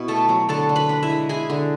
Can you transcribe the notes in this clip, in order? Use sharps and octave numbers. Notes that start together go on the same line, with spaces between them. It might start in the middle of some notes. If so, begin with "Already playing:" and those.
Already playing: B2 E4
A3 A4 A5
F#3
D3 A4 A5
D3
B4 B5
D4
E4 E5
G#3
E4 G#4 G#5
D3